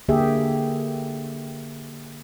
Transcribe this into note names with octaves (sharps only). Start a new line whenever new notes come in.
D3 A#3 G4 G#4 E5